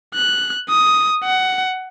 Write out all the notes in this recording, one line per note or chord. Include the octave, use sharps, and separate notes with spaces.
F#6
D#6
F#5